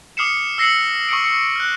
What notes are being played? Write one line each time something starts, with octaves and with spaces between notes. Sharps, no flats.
D6 D#6 F6 C7 C#7 E7
E6 A#6 C7 C#7 F#7
C#6 D#6 C#7 D7
C#7
F6 F#6